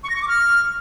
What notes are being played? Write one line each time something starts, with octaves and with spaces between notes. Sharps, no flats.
C#6
A#6
C#6
D6
F6